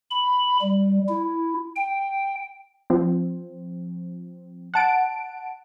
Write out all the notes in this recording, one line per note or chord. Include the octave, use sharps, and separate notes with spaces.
B5
G3
E4
G5
F3 C4
F#5 A5 D7